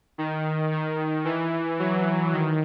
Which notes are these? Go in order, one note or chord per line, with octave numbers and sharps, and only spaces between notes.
D#3
D#3
E3
F#3
D#3